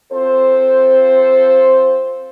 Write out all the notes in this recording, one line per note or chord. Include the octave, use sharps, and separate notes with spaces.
C4 F4 A4 C5